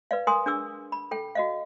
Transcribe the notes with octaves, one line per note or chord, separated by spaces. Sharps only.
B4 D5 F5
A#4 G#5 C6 D#6
D4 G#4 D6 E6
B5
A4 G5
F#4 D#5 F5